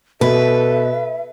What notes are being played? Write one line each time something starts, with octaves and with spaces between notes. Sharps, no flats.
B2 A4 B4 E5